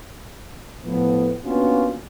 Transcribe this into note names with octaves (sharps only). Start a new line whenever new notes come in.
A2 F3 B3
A#3 B3 C#4 D4 F4 F#4